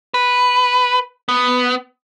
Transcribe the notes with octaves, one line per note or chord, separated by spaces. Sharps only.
B4
B3